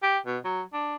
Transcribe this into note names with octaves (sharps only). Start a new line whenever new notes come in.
G4
B2
F#3
D4